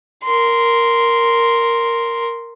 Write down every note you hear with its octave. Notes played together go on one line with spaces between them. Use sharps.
A#4 C6